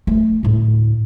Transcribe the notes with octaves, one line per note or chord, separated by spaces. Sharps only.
A3
D2 A2